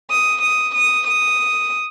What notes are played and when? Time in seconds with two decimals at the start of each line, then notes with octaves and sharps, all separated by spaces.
0.11 D#6
0.42 D#6
0.75 D#6
1.07 D#6